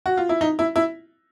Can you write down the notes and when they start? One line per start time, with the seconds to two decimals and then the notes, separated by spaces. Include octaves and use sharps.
0.06 F#4
0.17 F4
0.29 E4
0.41 D#4
0.59 E4
0.76 E4